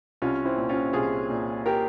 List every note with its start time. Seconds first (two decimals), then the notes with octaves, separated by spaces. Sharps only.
0.22 C2 C#4 F4
0.45 C4 E4
0.57 A#2
0.69 C#4 F4
0.93 C2 F4 G#4
1.30 A#2
1.66 G4 A#4